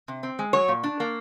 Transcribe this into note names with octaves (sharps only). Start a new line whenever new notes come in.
C3
C4
G#3
F#3 C#5
A#2
D4
A#3